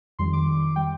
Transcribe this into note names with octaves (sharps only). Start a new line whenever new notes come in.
F2 D#3 G3 C6
D6
G3 G5